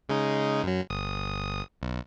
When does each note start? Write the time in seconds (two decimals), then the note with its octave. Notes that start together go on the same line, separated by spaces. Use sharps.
0.09 C#3 G#3 D#4
0.63 F#2 F#3
0.90 G1 D#6
1.82 B1